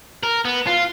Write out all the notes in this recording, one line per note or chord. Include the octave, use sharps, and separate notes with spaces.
A#4
B3
F4